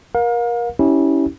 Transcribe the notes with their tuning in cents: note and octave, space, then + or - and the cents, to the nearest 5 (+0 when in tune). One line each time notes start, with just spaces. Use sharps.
A#4 +25 F5 +35
C#4 +0 E4 -30 G4 -15